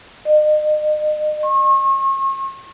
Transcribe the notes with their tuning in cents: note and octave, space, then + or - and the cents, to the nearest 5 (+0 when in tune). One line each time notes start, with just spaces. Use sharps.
D#5 -40
C#6 -40